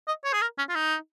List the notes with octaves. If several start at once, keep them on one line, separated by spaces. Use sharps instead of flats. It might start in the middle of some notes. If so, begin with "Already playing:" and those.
D#5
C#5
G#4
A#4
C#4
F4
D#4